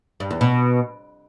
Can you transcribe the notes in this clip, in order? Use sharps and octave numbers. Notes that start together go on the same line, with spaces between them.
G2
E2
B2